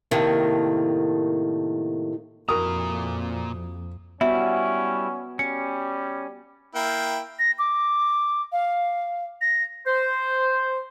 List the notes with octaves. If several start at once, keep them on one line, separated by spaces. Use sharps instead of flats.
A2 C3 D#3 A3 A#3
F2 A#2 E4 F#4 A#4 A#5 D#6
G3 B3 C#4 E4 F#4 E5
G3 C#4 C#7
A#3 E4 G5
A#6
D6
F5
A#6
C5